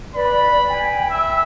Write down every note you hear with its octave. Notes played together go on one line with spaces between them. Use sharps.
B4 D5 B5
G5 G#5
E5 E6